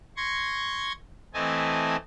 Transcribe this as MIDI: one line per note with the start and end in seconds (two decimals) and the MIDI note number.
0.17 0.92 84
0.17 0.92 85
0.17 0.92 92
0.17 0.92 94
1.34 1.96 52
1.34 1.96 57
1.34 1.96 60
1.34 1.96 75
1.34 1.96 80
1.34 1.96 81